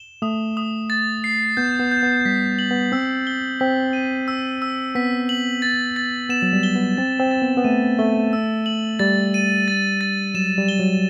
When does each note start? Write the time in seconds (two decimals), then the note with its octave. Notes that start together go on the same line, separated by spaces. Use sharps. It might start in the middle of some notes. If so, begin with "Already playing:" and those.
Already playing: E7 G7
0.22 A3 D#6
0.57 D#6
0.90 A6
1.24 C7
1.57 B3 G6
1.80 B3
1.92 G6
2.03 B3
2.25 G3 B6
2.59 F#7
2.71 B3
2.92 C4 E6
3.27 G7
3.60 C4 B6
3.93 D#7
4.28 E6
4.62 E6
4.95 B3 B6
5.29 F#7
5.62 A6
5.96 A6
6.29 B3 E7
6.42 F#3
6.53 G3
6.63 G7
6.75 B3
6.97 C4 A6
7.19 C4
7.31 A6
7.42 B3
7.57 B3
7.64 A3 D#7
7.99 A3 G7
8.33 E6
8.66 F#7
8.99 G3 A6
9.34 D#7
9.68 A6
10.01 A6
10.35 F#3 E7
10.58 G3
10.68 G7
10.79 F#3